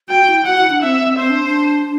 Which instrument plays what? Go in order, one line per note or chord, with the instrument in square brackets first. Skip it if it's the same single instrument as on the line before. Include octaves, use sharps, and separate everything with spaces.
[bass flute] F#4 [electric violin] G5
[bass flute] E4
[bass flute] F#4 [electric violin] F#5
[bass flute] E4
D4
[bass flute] C4 [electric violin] E5
[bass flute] C4
[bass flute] C4 [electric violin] C5
[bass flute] D4
D4